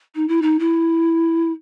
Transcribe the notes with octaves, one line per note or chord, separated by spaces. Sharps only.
D#4
E4
D#4
E4